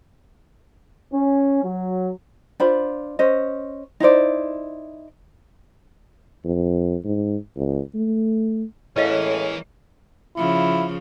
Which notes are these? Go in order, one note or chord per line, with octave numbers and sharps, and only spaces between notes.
C#4
F#3
D4 F4 C5 B5
C#4 C5 D#5
D#4 E4 C5 D5
F2
G#2
C#2
A3
A2 E3 G#3 A#3 C#4 B4 D#5 F5
C#3 F3 E4